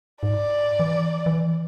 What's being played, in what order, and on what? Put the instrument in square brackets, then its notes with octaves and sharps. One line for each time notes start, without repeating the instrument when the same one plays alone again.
[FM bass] G#2 [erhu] D5
[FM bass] E3
E3